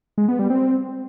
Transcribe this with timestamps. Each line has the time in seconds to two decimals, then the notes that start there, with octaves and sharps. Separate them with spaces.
0.18 G#3
0.28 B3
0.39 G3
0.50 C4